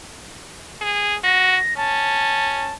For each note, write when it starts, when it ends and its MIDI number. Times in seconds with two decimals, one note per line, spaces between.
0.81 1.15 68
1.24 1.56 66
1.24 1.77 94
1.77 2.73 61
1.77 2.74 81